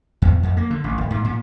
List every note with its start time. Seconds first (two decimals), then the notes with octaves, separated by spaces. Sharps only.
0.22 E2
0.43 F2
0.57 A#3
0.70 D3
0.84 A1
0.98 D1
1.11 G#2
1.24 A#2